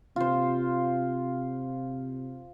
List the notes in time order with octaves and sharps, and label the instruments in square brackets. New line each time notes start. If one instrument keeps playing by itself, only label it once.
[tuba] C3 [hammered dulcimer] F4 C5